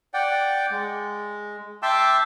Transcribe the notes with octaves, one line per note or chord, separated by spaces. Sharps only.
D5 F#5 G5
G#3
E5 G5 A5 C6 D6 E6